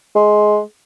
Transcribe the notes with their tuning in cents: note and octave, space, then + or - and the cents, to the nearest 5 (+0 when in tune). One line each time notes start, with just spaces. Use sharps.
G#3 +15